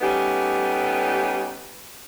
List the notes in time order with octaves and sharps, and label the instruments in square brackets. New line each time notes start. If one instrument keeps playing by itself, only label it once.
[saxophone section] G3 A3 B3 C#4 D#4 G4